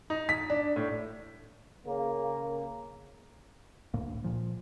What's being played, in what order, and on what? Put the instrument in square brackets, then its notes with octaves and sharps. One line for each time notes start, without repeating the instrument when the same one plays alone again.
[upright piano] D#4
B6
D4
A2
[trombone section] C#3 A#3
[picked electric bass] D2 A2 A#3
A#2 F3